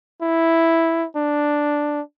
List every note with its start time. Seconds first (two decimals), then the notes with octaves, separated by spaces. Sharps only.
0.21 E4
1.16 D4